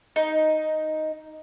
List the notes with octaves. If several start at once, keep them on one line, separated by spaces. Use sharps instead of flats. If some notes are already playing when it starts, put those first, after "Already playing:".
D#4